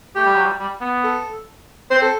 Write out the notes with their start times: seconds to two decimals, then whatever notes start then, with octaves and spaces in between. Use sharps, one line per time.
0.15 A3 G4
0.26 G3
0.36 F#3
0.46 G3
0.60 G3
0.81 B3
1.04 A4
1.91 C4 C5
2.02 A4